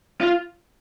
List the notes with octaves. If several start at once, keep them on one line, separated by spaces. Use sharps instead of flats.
F4